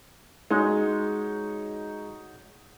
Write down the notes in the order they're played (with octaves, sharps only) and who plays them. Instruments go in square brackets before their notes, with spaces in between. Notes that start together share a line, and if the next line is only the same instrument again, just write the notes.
[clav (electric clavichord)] G#3 [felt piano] D#4 F#4 C#5